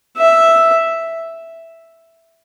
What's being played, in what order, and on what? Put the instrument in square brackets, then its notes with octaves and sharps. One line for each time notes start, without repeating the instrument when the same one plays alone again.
[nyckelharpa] E5